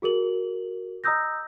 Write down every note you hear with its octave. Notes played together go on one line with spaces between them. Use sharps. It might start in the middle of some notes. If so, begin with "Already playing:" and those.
F#4 G#4 A#4 F#7
D#5 A#5 D#6 E6 G6 A#6